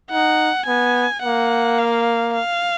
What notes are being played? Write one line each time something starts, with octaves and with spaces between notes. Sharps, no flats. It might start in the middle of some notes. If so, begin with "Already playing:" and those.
D#4 F#5
B3 G#5
A#3 F#5
F5
F5